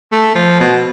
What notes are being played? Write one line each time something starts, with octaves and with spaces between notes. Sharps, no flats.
A3
F3
B2